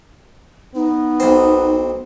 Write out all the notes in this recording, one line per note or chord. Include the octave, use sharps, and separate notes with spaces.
B3 D#4
B1 C4